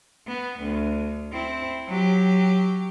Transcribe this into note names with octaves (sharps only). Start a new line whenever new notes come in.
B3
D2
C4 E4
F#3 G4